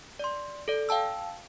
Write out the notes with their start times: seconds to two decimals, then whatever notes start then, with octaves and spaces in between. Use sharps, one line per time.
0.19 D5 C6
0.68 A4 D5
0.89 F5 G5 A5 E6